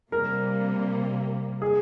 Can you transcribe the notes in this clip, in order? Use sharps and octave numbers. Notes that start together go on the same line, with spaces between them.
C3 G3 A#3 A#4
G#4